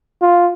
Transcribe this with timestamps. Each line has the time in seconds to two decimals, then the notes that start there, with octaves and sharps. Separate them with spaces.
0.22 F4